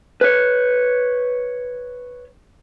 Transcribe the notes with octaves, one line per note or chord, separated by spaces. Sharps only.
B4 C#5